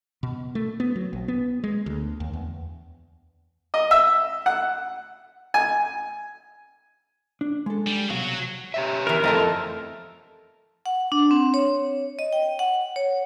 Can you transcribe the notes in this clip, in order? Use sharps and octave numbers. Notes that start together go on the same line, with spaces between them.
B2
A3
B3
F#3
A#1
B3
G#3
D2
D#2
E2
D#5
E5
F#5
G#5
D4
G#3 A4
G3
C2 B2 F#3 F#4 F5
G4 C#5 E5
B2 E3 A#4
F2 E3 A3 C4 A4 D#5 A5
F#5
D4
C4
C#5
D#5
G5
F#5
C#5